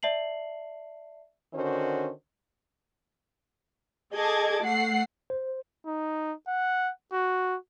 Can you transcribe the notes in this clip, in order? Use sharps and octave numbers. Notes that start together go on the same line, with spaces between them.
D5 E5 A5 C7 F#7
D3 D#3 C#4 F#4 C5
G#4 A4 D#5 A5 D6 G#6
A3 F#5 C7
C5
D#4
F#5
F#4